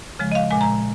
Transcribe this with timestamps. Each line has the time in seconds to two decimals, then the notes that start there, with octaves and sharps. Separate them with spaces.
0.19 C#3 F3 G#3
0.32 D#5
0.35 F5
0.51 A#2 G#3 G#5
0.61 A#5